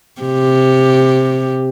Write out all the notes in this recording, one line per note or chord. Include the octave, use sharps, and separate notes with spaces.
C3 G4